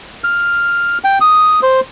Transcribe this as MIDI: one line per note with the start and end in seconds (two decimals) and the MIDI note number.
0.24 0.98 89
1.04 1.19 79
1.21 1.60 87
1.63 1.80 72